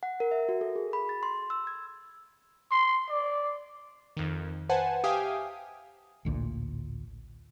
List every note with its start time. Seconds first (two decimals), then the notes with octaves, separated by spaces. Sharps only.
0.03 F#5
0.20 A#4
0.31 E5
0.49 F#4
0.61 A4
0.76 G#4
0.93 B5
1.09 A6
1.23 C6
1.50 E6
1.67 G#6
2.71 C6
3.09 D5
4.17 F2 D#3
4.69 B4 C5 F#5 G#5 A5
5.04 G4 E5 F5 G5 G#5 D#6
6.25 A1 D2 A#2